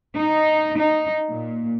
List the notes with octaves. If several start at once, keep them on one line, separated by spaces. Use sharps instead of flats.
D#4
D#4
A#2